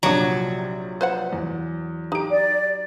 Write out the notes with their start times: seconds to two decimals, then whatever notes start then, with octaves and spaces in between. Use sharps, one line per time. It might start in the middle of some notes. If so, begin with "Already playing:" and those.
0.03 A#1 C3 F#3 D4 A#5
1.01 B4 C5 F#5
1.33 E2
2.12 D#4 G4 D7
2.31 D5